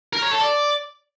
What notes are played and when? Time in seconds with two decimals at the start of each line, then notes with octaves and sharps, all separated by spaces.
0.13 A#4
0.22 C#5
0.31 A4
0.41 D5